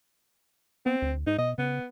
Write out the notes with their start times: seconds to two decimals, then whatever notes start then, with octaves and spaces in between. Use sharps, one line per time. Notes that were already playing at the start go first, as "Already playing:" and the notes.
0.86 B3 C4
1.02 D2
1.27 G#2 D#4
1.38 B2 D#5
1.58 C#3 B3